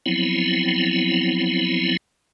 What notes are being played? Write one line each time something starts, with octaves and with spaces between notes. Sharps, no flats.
F3 F#3 B3 C4 E4